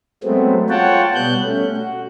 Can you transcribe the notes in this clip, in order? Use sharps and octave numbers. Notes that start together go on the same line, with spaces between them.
F#3 G#3 A3 B3 C4
F4 C#5 F#5 G5 A5
B2 G3 B3 F#6 G6
A3 C#4
F#4